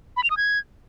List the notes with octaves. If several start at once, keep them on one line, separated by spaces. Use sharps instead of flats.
B5
F7
D#6
G#6